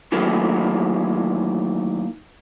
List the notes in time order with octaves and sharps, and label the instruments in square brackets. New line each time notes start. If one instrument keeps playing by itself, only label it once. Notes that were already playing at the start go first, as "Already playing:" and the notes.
[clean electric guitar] D#3 E3 F#3 A3 A#3